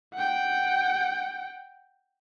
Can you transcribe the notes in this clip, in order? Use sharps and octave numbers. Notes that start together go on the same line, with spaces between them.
F#5 G5